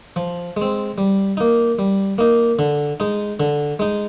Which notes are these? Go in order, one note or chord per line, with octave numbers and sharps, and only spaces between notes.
F3
G#3 C4
G3
A#3 D#4
G3
A#3 D#4
D3
G#3 D#4
D3
G#3 D#4